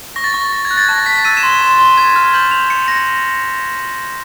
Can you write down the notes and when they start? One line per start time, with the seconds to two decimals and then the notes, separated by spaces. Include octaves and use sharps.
0.16 C#6 A#6
0.24 A6
0.33 C#6 A#6
0.52 A#6
0.65 G#6
0.71 F#6
0.77 A6
0.88 A5 A#6
1.06 A6 B6
1.25 E6 D#7
1.37 E7
1.43 C6
1.50 G7
1.61 C6
1.79 C6
1.98 G#6
2.16 F6
2.34 G6 F#7
2.51 F7
2.70 C#7
2.88 A#6